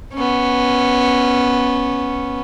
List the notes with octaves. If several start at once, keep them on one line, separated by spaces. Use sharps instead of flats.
B3 C#4